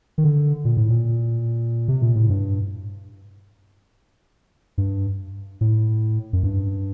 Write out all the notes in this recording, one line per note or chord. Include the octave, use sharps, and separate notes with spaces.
D#3
D3
A#2
A2
A#2
C3
A#2
A2
G2
G2
A2
F#2
G2